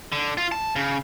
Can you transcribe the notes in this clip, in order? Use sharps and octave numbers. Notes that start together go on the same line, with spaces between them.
D3
F4
A5
C#3